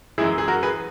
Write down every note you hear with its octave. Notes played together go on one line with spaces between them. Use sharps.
F#2 E3 G#3 E4 G#4
G#4
F#4 A#4
G#4 B4